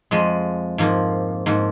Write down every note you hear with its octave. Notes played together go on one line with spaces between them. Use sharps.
F2 F3 G#3
G#2 F3 A#3
G#2 F3 A#3